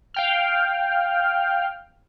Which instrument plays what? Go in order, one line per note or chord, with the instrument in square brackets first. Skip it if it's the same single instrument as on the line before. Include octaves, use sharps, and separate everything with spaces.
[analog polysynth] F5 G5 F6